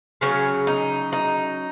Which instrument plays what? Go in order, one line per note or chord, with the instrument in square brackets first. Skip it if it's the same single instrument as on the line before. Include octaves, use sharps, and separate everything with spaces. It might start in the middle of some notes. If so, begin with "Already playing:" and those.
[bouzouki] C#3 F#3 C#4
D#4
D#4